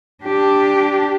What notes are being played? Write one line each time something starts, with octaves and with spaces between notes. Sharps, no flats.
D4 G4